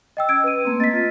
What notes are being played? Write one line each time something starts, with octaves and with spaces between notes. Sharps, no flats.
D#5 G5 E6
C#4 E6 G#6 D7
B4 D#7
A3 A#3 C4
D#5 A6 B6
F4